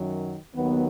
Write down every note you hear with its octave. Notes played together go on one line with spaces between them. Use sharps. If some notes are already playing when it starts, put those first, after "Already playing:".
Already playing: F#2 D#3 F#3
D#2 D#3 F#3 B3